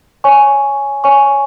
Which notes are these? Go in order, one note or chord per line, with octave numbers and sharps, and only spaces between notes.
C#5 G#5 C#6
C#5 G#5 C#6